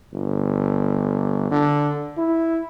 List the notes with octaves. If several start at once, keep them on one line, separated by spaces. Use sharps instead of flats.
G1
D3
E4